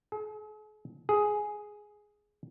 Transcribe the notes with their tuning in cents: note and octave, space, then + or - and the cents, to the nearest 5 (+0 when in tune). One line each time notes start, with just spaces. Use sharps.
G#4 +45
G#4 +5